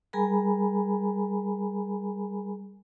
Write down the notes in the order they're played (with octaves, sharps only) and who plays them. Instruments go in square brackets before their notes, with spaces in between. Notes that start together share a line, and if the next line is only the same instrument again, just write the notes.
[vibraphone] G3 G#4 A#4 G#5 A#5 B5